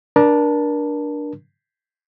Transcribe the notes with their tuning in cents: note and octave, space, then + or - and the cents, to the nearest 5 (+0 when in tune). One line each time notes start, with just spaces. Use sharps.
D4 +0 A#4 +30 A5 +0